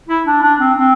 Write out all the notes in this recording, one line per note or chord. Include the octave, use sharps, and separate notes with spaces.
E4
D4
D4
C4
C4